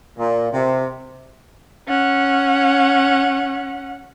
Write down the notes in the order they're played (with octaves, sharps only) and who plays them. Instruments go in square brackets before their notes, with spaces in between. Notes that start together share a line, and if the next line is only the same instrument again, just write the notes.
[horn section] A#2
C3
[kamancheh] C#4 F#5